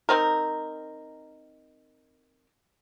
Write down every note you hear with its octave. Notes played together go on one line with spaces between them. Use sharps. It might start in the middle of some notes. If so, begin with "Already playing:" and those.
C4 D#4 A#4